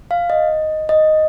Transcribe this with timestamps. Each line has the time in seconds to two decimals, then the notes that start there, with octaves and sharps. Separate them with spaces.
0.11 F5
0.30 D#5
0.89 D#5